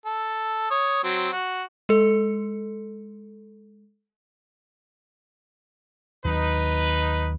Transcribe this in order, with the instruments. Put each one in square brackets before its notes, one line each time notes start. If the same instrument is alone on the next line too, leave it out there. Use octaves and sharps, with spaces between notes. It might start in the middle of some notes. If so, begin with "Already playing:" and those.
[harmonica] A4
C#5 D#6
F#3 C4
F#4
[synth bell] G#3 A4
[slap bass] D#2 F#3 [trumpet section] D#4 B4